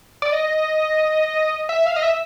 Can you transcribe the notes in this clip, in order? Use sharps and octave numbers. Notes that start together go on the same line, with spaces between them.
D5
D#5
E5
F5
D#5
E5